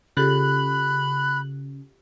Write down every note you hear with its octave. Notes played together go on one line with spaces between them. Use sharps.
C#3 F4 G4 A4 B5 F#6